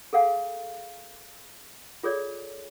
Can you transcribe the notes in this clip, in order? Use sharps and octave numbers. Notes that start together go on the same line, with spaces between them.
G#4 A4 F5 F#5 G#5
F4 G#4 A4 C#5 D5